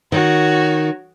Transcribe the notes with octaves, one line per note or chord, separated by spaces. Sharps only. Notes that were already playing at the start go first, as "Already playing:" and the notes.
D#3 F#4 C#5